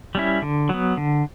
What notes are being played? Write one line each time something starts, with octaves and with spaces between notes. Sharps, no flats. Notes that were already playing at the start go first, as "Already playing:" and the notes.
G3 C#4 E4
D3
F#3 B3
D3